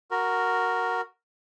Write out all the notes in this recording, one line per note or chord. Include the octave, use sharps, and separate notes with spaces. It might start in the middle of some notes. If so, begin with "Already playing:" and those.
F#4 A#4